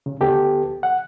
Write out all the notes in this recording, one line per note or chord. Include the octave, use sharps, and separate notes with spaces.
C#3
D2 B3 G4 A4
F#5